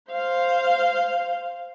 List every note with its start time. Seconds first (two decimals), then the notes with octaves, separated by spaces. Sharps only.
0.11 C5 F5